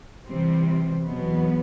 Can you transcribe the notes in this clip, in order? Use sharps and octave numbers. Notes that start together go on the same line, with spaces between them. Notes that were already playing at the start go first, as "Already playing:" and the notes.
C3 E3 G3 C4
E2 B2 F#3 B3